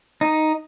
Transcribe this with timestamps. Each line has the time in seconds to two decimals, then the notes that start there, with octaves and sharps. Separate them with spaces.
0.21 D#4